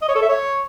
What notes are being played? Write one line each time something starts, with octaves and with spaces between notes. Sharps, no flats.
D#5
C#5
A4
E5
C#5